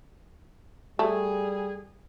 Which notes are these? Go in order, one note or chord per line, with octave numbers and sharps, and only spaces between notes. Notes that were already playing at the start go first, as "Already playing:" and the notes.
G3 A3 G#4